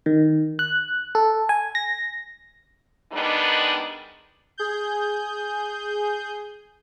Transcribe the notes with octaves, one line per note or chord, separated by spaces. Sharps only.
D#3
F#6
A4
G#5
A#6
D#3 G3 G#3 B3 D4 D#4
G#4 G6